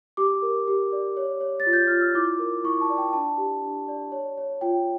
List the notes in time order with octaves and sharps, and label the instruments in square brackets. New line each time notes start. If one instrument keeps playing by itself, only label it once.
[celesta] G4 D6
A#4
G4
D5
C#5
C#5
A6
F4
G6
F4 F6
E6
E4 D6
A#4
E4 C#6
A5
D5
G5
D4 A5
G4
D4
D5
C#5
C#5
F4 G5